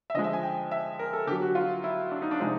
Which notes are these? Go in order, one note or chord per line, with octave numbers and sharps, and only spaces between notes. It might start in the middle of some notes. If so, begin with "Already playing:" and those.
E5
D3 F3 G#3 D#5
E5
G#5
G5
E5
A#4
A4
D3 F#3 G4
F#4
F4
E4
D4
D#4
D4
C3 F3 G#3 D#4